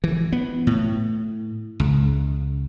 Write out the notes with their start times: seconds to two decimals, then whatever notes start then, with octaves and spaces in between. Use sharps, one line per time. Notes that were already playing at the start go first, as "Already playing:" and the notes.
0.04 E3
0.32 B3
0.67 A2
1.80 C#2